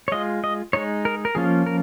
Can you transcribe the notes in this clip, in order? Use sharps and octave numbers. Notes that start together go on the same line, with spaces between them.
C#5
G#3 F4 D#5
D#5
G#3 D#4 C#5
A#4
A#4
F3 A#3 C#4 F4 G#4
A#4